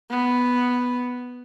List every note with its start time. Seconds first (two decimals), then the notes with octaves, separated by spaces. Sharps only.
0.10 B3